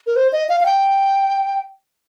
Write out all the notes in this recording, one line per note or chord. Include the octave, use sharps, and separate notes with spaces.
A#4
C5
D#5
F5
F5
G5